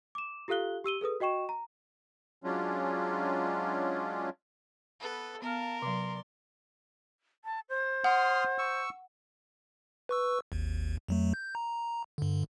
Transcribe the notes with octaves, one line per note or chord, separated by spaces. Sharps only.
D6 E7
F4 G4 A4 F5 F#6 G7
G4 E6 D#7 G7
G#4 A4 B4 D#6
F#4 D#5 G5 C#6 E7
A#5
F#3 G#3 C#4 D4 F4
B3 A4 B4
B3 A#4 F5 A5 F6
C3 F#3 D5 C6
A5
C5
F#5 C6 D#6 F6
C#6 E6
B4 C#6 E6
G#1 D#2
F2 F#3 A3
G6
A#5
G2 D3